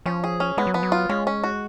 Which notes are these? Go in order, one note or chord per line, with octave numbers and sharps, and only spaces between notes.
F3 C#4
G#4
C#4
G#3 B3
F#3
F3 B3
F#3
F4
G#3 C#4
C#4
F#4